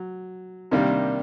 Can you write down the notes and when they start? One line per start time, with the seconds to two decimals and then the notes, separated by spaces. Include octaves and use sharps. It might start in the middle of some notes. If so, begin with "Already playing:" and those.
Already playing: F#3
0.71 C3 D#3 G3 A#3 D4